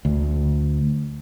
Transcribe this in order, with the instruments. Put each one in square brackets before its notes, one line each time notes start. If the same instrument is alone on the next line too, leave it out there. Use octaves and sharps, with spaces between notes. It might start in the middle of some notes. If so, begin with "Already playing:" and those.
[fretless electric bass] D2